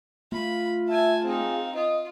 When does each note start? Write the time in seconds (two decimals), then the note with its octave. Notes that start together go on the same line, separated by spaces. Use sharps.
0.32 A3 F4 B5
0.88 E5 G#5 A5
1.24 C4 D#4 G#4
1.75 F4 D#5